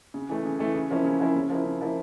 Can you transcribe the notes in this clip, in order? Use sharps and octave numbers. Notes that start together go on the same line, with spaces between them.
C#3
E3 A3
C#3
E3 A3
C#3
F3 A#3 C#4 E4
C#3
F3 A#3 C#4 E4
C#3
F3 A#3 E4
C#3
F3 A#3 E4